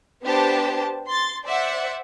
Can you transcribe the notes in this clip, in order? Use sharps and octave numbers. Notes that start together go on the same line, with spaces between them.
B3 D4 G4 C5 A5
C6 A6
C5 D5 E5 F#5